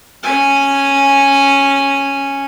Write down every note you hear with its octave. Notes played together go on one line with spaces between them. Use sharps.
C#4 G#5